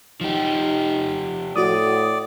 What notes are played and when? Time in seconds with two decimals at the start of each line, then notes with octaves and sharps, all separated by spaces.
0.21 F3 D#4 G4
1.56 A2 F#4 D5 D#6